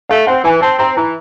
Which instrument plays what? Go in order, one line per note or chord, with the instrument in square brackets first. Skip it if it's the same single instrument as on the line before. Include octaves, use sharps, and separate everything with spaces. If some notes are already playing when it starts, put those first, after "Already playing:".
[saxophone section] A3 [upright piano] F5
[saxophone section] C4 [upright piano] F#5
[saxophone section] E3 [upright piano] G#5
[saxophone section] C4 [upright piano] A5
[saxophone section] C4 [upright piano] A#5
[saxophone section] E3 [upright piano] A#5